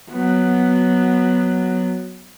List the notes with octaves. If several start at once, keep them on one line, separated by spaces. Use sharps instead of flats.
F#3 B3